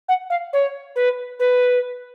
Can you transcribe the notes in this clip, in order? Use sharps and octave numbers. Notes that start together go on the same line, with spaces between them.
F#5
F5
C#5
B4
B4